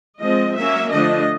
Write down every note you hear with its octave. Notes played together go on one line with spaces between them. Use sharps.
F3 G#3 C4 D#5
F#3 A#3 C#4 E5
D3 F3 A3 D4 D#5